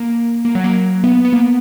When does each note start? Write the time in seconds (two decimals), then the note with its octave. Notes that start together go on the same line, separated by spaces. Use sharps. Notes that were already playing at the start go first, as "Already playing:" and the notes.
Already playing: A#3
0.45 A#3
0.55 F#3
0.64 A#3
1.04 B3
1.25 B3
1.33 A#3